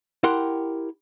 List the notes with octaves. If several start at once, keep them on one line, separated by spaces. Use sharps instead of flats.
E4 G4 A#4 F#5 G5 C6